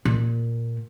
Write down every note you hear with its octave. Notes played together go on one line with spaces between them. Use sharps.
A#2